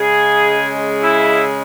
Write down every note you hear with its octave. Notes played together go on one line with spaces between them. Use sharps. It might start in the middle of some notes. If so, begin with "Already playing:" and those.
Already playing: C#3 G#3 G#4
E4